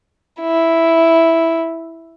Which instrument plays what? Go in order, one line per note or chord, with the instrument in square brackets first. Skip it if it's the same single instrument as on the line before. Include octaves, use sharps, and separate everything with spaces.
[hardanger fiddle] E4